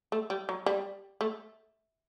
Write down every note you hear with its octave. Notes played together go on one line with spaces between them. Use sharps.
A3
G3
F#3
G3
A3